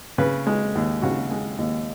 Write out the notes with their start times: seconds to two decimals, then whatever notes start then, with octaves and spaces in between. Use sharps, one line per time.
0.18 C#3 B4
0.47 G#3
0.75 D#2
1.02 C#3 F#4
1.31 G#3
1.58 D#2